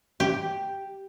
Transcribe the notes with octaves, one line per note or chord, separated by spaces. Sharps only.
G4